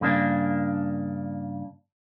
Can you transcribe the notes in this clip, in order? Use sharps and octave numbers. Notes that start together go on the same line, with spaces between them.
G2 C#3 A#3 D4